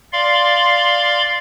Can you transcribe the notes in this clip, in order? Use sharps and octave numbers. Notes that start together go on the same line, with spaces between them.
D5 F5 C6